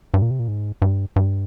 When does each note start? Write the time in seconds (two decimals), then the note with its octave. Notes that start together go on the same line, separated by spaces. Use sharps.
0.14 G2
0.22 A#2
0.31 C3
0.39 A#2
0.48 G#2
0.82 G2
1.16 G2